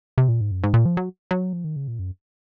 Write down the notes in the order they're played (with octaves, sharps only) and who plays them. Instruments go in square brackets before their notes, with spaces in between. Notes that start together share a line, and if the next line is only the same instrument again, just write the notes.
[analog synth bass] C3
A#2
G#2
F#2
G#2
A#2
F3
F#3
F#3
F3
D#3
C#3
A#2
F#2